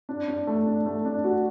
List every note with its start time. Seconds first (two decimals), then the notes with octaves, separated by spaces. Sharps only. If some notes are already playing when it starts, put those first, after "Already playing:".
0.09 D4
0.28 D4
0.47 A3
0.66 D4
0.86 A3
1.05 D4
1.24 F#4